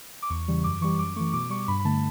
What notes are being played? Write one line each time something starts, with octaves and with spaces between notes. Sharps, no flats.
D6
E2 C#6
C#3 E3 G3
F#2 D6
E3 G3 C#6
F#2 D6
E3 A3 C#6
B2 D6
G3 C#6
G2 B5
B5
D3 A3 A5